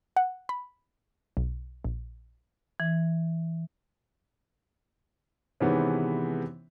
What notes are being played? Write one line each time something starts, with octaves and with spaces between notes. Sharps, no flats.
F#5
B5
B1
A#1
E3
C3 D#3 E3 G#3 B3 C#4